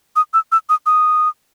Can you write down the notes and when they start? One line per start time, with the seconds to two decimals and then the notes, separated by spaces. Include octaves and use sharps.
0.16 D#6
0.34 E6
0.52 E6
0.69 D#6
0.86 D#6